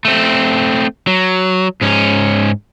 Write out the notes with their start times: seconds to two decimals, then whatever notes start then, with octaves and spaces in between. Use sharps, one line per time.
0.05 A3 C4
1.07 F#3
1.81 G#2 C#4